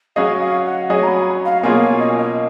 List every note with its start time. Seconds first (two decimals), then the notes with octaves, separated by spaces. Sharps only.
0.16 F#3 C#4 G#4 D#5 F5
0.40 F5
0.65 F#5
0.90 F#3 C#4 G#4 D#5 G#5
1.03 A#5
1.08 B5
1.45 F5
1.63 B2 A#3 C#4 F4 G#4 G#5
1.82 G#5
2.00 D#5
2.18 D#5